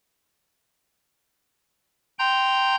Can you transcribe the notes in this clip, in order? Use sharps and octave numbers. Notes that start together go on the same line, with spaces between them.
G5 A#5 C6 G6